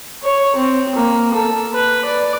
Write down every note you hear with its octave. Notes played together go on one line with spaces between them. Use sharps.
C#5
C4
A#3
A4
B4
D5